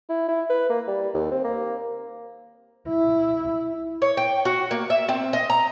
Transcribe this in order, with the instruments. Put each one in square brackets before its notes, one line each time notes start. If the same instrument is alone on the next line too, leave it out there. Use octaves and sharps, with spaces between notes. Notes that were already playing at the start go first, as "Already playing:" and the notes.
[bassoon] E4
E4
B4
A#3
G3
D#2
C4
A#3
[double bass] E4
[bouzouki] C#5
G5
F#4
A#3
E5
C4
D#5
A#5